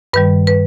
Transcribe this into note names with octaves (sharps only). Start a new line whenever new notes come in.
G2 D#3 G3 B4
B4